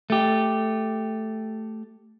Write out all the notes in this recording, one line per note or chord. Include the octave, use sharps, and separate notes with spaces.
A3 G4